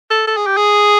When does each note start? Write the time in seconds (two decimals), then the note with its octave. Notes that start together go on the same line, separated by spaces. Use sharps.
0.11 A4
0.27 A4
0.37 G#4
0.46 G4
0.57 G#4